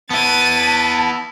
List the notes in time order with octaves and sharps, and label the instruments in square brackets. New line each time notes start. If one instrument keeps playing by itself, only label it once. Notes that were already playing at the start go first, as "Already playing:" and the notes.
[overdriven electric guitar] B3 E4 [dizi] A5 [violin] A6 D#7